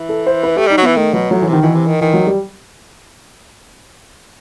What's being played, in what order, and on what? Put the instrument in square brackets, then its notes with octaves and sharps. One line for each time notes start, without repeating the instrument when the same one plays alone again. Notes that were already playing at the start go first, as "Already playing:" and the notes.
Already playing: [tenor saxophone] E3
[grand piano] A4
C5
B4
[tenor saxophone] A3 [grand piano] G4
[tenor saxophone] G3 [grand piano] D#4
[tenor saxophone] F#3
[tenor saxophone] E3 [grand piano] B3
[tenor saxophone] D#3 [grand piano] A3
[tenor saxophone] B2 [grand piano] F#3
[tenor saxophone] A2 [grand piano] F#3
[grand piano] E3
[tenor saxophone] C3 [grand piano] D#3
[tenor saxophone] B2 [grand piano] E3
[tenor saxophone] C3
D#3
[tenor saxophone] D#3 [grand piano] E3
[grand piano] F#3
G3